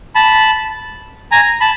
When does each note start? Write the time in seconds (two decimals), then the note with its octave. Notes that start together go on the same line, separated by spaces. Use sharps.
0.15 A5 B5
1.32 G#5 A#5
1.61 A5 B5